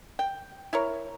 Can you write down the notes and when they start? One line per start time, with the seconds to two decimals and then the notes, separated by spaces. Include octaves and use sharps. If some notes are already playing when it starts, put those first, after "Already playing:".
0.19 G5
0.73 E4 A#4 C#5